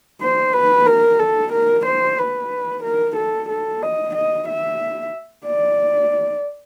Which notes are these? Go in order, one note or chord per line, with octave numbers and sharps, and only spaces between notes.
C5
B4
A#4
A4
A#4
C5
B4
A#4
A4
A4
D#5
D#5
E5
D5